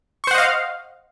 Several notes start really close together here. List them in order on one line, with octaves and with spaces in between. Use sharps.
C#6 C5 F#5 D#5 F5